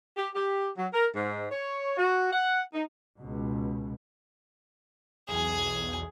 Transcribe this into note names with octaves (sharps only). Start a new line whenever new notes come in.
G4
G4
F#3
A#4
G#2
C#5
F#4
F#5
D#4
C#2 B2
B1 E2 G#4 G#5